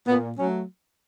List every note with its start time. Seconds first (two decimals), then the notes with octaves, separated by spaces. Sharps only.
0.07 A#2 B3
0.37 F#3 A3 C#4